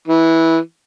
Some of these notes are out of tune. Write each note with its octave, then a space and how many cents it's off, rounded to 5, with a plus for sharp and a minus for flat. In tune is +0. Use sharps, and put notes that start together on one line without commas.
E3 -15